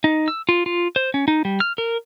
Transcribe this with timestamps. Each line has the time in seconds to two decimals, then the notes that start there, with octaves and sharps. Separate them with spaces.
0.04 D#4
0.28 E6
0.49 F4
0.66 F4
0.96 C5
1.14 C#4
1.28 D#4
1.45 G3
1.60 F6
1.78 A#4